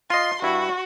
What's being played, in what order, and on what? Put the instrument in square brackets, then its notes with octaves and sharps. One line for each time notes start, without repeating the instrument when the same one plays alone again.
[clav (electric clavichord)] F4 D#5 [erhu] C6
[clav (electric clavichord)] G2 E4 [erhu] F#4